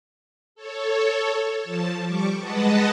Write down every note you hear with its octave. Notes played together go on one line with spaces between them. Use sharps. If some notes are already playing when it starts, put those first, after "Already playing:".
A4 C#5
F3 A5
G3 C#6 D6
G#3 B4 D#5 F#5 A5